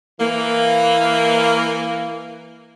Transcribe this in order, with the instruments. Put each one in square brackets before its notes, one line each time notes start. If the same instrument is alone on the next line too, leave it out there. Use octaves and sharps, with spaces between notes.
[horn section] E3 A#3